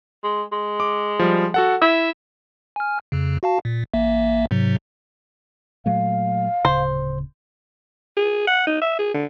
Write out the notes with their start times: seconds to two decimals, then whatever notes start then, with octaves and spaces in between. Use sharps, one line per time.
0.24 G#3
0.52 G#3
0.80 D6
1.19 F3 G3
1.54 F#4 A4 F#5
1.82 E4 E5
2.76 G#5 F6
3.12 F2 C#3
3.43 F#4 F5 A5
3.65 A#2
3.93 A1 A#3 E5
4.51 G#2 C3 F#3
5.86 A#2 F#3 A3 F5
6.65 D1 C#3 C5
8.16 G#4
8.47 F#5
8.67 D#4
8.81 E5
8.99 G#4
9.14 D3